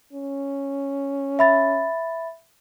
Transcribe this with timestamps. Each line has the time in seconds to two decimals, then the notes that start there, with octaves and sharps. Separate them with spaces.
0.13 C#4
1.39 E5 B5 A6